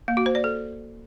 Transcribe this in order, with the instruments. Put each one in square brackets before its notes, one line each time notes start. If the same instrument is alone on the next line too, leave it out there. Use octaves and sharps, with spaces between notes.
[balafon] A#3
F#4
C5
D5
A4